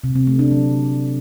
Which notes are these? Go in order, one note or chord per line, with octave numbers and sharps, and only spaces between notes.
C3
C4
A3
D4
F#3